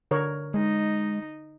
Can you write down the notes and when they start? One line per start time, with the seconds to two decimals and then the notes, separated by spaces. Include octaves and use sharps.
0.11 D3 A#4 C#5
0.54 G#3 D#4